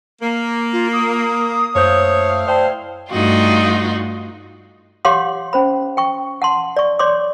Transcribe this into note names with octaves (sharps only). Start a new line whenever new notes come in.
A#3
F4
D#6
F#2 A3 E4 C5 C#5 F5 G6
C5 D5 G5 A5
G2 A3 D#4 F4 F#4
G4 C#5 F5 F#5 C6 D6
C#4 C5 B5
G5 C#6
F#5 A5 C6
D5 C#6
C#5 D5 C6 D6